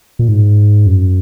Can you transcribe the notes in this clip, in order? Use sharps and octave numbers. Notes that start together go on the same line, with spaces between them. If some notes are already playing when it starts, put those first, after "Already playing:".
A#2
G#2
F#2